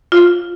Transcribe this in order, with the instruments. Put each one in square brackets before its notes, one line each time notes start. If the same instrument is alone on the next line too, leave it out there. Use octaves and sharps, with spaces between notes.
[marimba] F4